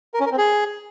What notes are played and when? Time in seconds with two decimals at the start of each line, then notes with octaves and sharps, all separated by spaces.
0.14 A#4
0.20 C#4
0.26 A#4
0.32 C4
0.38 G#4